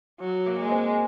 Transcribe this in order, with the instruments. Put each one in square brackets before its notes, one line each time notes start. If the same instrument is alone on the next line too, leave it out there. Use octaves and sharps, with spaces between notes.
[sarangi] F#3
[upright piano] A#3
[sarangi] G#3
[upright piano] C4